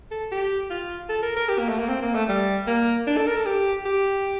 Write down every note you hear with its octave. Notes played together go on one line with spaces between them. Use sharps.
A4
G4
F4
A4
A#4
A#4
G4
A#3
A3
A#3
C4
A#3
A3
G3
A#3
D4
A4
A#4
A4
G4
G4